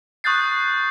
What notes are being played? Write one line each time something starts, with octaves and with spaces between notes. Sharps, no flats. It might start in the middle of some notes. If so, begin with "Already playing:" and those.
C#6 D#6 F#6 G6 A6 C7